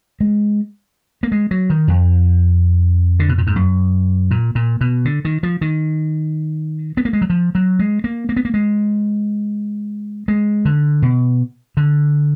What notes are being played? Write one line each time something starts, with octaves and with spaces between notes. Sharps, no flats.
G#3
A#3
G#3
F#3
D#3
F2
D3
B2
A#2
G#2
F#2
A#2
A#2
B2
D3
D#3
F3
D#3
B3
A#3
G#3
F#3
F3
F#3
G#3
A#3
A#3
B3
A#3
G#3
G#3
D3
B2
D3